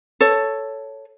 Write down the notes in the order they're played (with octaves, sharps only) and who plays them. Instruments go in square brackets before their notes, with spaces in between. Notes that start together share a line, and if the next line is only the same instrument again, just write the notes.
[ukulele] A4 C#5